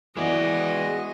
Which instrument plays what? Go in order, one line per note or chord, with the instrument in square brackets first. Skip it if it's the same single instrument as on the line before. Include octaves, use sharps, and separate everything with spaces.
[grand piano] E3 B3 [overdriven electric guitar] G#3 D5 [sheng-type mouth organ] F#4 G#5 [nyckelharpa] D#5